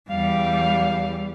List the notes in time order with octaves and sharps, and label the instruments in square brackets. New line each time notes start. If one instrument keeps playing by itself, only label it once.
[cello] E2 G3 [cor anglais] F5